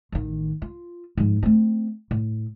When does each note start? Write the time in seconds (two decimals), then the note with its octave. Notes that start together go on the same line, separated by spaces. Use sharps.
0.12 A1 D#3
0.62 F4
1.17 G#2 F3
1.43 A3 C4
2.11 A2